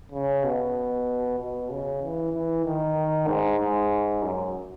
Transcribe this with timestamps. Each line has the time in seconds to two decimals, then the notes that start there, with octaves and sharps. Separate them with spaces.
0.12 C#3
0.43 B2
1.39 B2
1.70 C#3
2.02 E3
2.33 E3
2.64 D#3
3.28 G#2
3.60 G#2
4.22 F#2